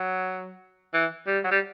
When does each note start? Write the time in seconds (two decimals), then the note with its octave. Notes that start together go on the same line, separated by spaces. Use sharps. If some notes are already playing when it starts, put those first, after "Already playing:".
Already playing: F#3
0.94 E3
1.27 G3
1.44 F#3
1.51 G3